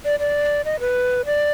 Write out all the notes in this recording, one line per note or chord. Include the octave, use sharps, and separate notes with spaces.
D5
D5
D#5
B4
D5